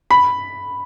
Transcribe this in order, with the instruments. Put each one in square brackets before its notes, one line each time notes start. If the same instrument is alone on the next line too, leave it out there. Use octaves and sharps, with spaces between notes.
[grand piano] B5